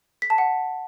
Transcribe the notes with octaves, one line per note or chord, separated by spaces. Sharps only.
B6
A5
F#5